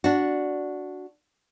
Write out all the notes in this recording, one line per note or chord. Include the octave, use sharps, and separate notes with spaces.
D4 F#4